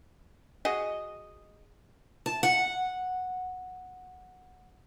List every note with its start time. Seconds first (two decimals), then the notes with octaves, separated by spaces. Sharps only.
0.65 F#4 G#4 D#5
2.26 A5
2.43 F#5